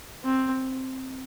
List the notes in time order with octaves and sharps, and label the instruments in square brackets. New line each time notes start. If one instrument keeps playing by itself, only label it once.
[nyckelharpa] C4